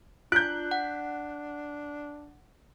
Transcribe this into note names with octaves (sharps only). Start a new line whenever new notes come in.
D4 F4 F#6 G6
F#5